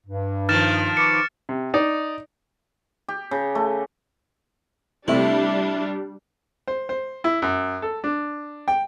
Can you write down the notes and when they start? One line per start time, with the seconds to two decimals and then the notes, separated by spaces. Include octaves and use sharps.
0.07 G2
0.49 D#3 F3 F6 A6 E7
0.97 B4 C#6 D6 C#7
1.49 C3
1.74 D#4 D5
3.08 G4
3.31 C#3
3.55 A3
5.08 C3 G3 A3 D4 E4
6.68 C5
6.89 C5
7.24 E4
7.42 F#2
7.82 A4
8.04 D4
8.68 G5